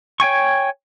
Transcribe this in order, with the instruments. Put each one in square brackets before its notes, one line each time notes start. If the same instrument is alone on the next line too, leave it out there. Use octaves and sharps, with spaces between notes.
[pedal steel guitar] C#5 G5 G#5 C#6